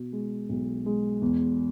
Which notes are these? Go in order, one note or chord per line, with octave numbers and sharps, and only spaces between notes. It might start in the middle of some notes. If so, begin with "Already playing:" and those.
Already playing: B2
G#3
B1
G#3
E2